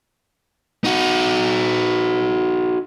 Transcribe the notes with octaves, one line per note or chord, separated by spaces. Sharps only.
D#4 F#4